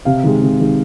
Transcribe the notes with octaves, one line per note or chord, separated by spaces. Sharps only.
C3 F5
D#3 G#3
C3
D#3 G#3